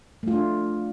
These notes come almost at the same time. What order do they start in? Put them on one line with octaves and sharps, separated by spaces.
A3 F4 D4